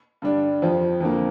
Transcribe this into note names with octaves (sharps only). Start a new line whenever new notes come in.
G2 D3 G3 D4
F2 F3 C4 F4
F2 D3 F3 A#3